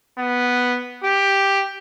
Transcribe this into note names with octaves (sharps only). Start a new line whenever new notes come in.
B3
G4